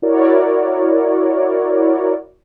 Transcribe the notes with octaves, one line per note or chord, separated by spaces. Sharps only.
E4 F#4 A#4 C#5 D5